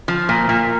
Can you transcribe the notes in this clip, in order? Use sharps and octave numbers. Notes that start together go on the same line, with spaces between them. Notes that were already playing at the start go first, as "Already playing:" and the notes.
F3
A#2
A#2